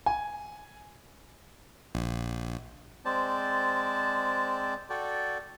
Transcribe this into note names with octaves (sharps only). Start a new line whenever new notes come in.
G#5
A#1
G#3 C4 C5 D5 A5
F#4 A4 D5 G5